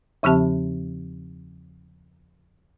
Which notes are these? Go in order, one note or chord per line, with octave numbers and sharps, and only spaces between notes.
E2 C#3 F3 C4 G4 A5